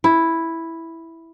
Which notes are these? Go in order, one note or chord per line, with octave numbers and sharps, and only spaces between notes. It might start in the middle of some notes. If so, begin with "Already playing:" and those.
E4